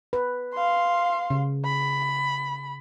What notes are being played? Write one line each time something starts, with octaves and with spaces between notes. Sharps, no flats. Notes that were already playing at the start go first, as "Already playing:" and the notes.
B4
F5 C6
C#3
B5